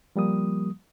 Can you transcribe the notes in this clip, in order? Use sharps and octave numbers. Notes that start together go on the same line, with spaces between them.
F3 G3 A#3 D#6